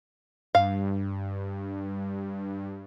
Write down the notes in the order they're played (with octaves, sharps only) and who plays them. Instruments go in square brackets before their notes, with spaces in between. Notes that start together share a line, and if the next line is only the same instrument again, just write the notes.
[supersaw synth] G2 [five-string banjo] F5